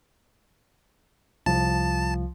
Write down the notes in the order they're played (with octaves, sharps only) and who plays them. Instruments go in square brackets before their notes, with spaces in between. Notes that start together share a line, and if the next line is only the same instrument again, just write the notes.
[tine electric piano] C2 [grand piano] F3 [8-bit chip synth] A5